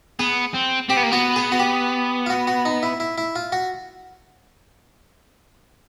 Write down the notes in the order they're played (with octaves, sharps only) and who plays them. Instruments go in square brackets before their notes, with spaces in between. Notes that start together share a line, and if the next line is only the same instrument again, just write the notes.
[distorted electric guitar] B3 [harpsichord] G#4
[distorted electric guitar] C4
[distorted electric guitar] C4 [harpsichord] G4
[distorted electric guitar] B3
A#3
[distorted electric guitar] B3 [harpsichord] F#4
[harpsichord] G#4
F#4
G4
F4
F#4
F#4
D#4
E4
E4
E4
F4
F#4